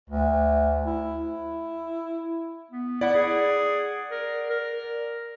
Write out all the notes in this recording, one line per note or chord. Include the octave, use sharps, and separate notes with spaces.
D2
E4
B3
E4 D5 F#5
G#4
A#4
A#4